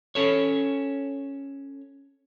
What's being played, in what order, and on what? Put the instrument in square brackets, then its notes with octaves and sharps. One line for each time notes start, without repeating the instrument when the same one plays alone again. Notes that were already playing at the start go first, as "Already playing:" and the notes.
[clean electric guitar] C#4 A4 C#5